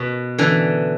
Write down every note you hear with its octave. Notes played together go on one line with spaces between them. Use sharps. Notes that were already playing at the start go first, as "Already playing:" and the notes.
Already playing: B2
D3 E3